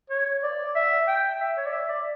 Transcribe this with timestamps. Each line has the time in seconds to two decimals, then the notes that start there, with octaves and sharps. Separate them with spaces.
0.10 C#5
0.43 D5
0.75 E5
1.08 G5
1.41 E5
1.57 C#5
1.66 D5
1.72 E5
1.89 D5